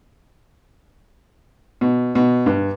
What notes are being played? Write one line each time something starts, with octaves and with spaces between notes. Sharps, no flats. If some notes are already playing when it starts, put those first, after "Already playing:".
B2
B2
G2